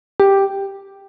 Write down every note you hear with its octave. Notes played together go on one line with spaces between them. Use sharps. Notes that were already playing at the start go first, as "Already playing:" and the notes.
G4